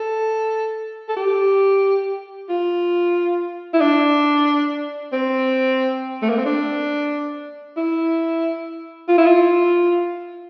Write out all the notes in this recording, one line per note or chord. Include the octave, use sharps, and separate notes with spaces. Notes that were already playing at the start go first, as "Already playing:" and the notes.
Already playing: A4
A4
G4
F4
E4
D4
C4
A3
A#3
C4
D4
E4
F4
E4
F4